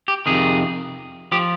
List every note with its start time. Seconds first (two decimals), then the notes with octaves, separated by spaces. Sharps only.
0.08 G4
0.26 F2 C3 D#3 G#4
1.32 F3 G4